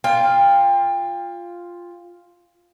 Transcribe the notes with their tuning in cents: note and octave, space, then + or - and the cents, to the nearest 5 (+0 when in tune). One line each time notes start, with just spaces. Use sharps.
F4 +0 G5 +30